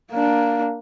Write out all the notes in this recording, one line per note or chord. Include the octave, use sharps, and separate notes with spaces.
A#3 D4